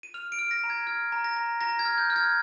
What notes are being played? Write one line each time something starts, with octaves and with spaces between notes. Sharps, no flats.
D#7
F6 F7
D7
F6
A#6
A#5
G#6
F6 G#6
A#5
A#6
A#5
A#5 A#6
G#6
F6
G6
F6
G#6